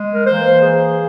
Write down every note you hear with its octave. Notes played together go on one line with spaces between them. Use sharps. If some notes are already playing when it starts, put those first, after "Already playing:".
Already playing: G#3
A#4
E3 A#3 C5
G#4